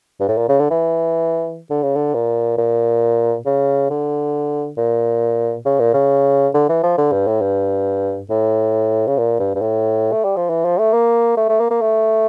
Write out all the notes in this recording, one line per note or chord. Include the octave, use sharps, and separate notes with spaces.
G2
A2
A#2
C#3
D3
E3
D3
C#3
D3
A#2
A#2
C#3
D3
A#2
C#3
A#2
C#3
D3
E3
F3
D3
G2
A2
G2
A2
C#3
A#2
G2
G2
A2
A3
G3
F3
E3
F3
A3
A#3
A3
A3
A#3
A#3
A3